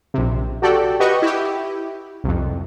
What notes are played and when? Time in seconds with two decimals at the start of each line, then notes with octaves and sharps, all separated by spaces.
0.14 A#1 C3
0.62 F#4 G4 A4 D5 G5
1.00 F#4 G4 B4 D#5 C#6
1.22 E4 G4
2.24 C2 F2